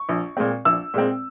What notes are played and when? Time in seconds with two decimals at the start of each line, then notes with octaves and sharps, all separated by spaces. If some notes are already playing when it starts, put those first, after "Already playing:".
Already playing: C#6
0.09 A#1
0.37 A#2 G#3 C4
0.65 A#1 E6
0.94 A#2 G#3 C4